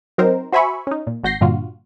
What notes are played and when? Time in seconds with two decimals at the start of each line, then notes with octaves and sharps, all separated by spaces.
0.18 F#3 C4 D#4 A#4 C5
0.52 F#4 C5 E5 G#5 B5 C#6
0.87 C#4 D#4
1.07 A#2
1.24 G#1 F#4 G6 A#6 C7
1.41 G2 A#2 D3 F4 F#4